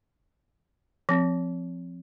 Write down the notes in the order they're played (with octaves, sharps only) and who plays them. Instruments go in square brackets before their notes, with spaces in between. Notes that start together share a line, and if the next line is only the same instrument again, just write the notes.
[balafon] F3 C4